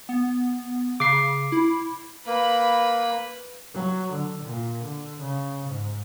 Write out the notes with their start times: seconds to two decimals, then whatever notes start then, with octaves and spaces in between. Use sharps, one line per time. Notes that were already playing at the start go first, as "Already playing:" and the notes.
0.09 B3
1.00 C#3 D6 C7
1.52 E4
2.27 A#3 B4 B5
3.74 F#3
4.12 D3
4.43 A#2
4.83 D3
5.19 C#3
5.68 G#2